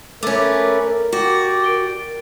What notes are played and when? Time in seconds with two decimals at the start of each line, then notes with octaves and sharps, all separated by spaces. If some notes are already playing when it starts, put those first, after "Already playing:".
0.23 A3 C#4 A#4 B4 D5 B5 D6
1.12 F#4 G4 D5
1.64 A#4 D7 G7